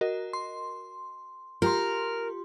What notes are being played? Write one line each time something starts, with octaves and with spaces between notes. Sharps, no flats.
F#4 A#4 D#5
C6
F4 G4 A#4 C6